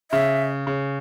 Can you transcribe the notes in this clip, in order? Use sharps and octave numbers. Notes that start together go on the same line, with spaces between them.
C#3 E5
C#3